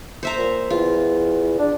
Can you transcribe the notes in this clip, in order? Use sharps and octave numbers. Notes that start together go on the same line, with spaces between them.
C5 E5 A#5
A#2
E2 F4
D4